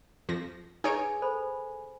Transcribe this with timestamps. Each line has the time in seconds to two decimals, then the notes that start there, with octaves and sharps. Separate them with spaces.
0.29 F2 F3 A#6
0.84 D#4 G#4 B4 C#5 G#5 D7
1.22 A4 C5 B5